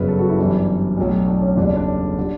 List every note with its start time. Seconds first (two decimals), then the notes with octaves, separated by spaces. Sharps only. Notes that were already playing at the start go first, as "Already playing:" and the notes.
Already playing: G1 F#2 C#3 F#3 B4
0.08 A4
0.19 F#4
0.29 E4
0.38 G1 F#2 E3 G3 D4
0.97 B1 A2 F#3
1.27 D4
1.42 C#4
1.57 F#1 E2 D3 G3 D4
1.67 C#4
1.76 D4
2.18 D3 G3